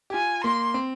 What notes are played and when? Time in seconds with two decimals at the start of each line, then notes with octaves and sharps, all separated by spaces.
0.10 G4
0.14 F4 G#5
0.44 A#3 C6
0.74 C4